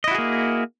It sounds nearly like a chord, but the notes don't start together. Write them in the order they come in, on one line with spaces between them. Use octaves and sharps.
D#5 E4 F#4 G#4 A#3